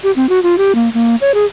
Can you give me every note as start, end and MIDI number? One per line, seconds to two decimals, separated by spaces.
0.04 0.11 67
0.16 0.29 60
0.29 0.39 66
0.43 0.57 65
0.58 0.74 67
0.75 0.89 58
0.94 1.15 58
1.21 1.34 73
1.34 1.45 68